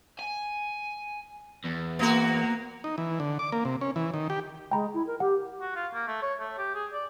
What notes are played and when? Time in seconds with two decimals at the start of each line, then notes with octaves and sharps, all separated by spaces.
0.19 G#5
1.64 E2
1.99 A#3 B3 F#4
2.84 D#4
2.98 E3
3.20 D3
3.39 D6
3.52 A#3
3.65 C3
3.81 C#4
3.96 E3
4.14 D#3
4.30 G4
4.71 G#3 G5 A#5 B5
4.94 E4
5.07 A#4
5.20 G4 F#5
5.60 F#4
5.75 F4
5.94 A#3
6.07 A3
6.22 C#5
6.40 A3
6.58 G4
6.74 G#4
6.93 D5